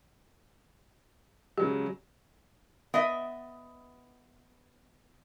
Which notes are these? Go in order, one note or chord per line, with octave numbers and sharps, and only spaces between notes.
C#3 F#3 G#3 G4
B3 D#5 E5